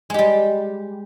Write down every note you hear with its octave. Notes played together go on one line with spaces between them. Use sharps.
G3 G#3 G4